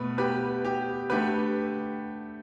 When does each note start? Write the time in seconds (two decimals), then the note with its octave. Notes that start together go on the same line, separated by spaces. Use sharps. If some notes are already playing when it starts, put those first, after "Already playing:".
Already playing: B2 A3 B4
0.18 G4 B4
0.65 G4
1.10 D3 A3 G4 B4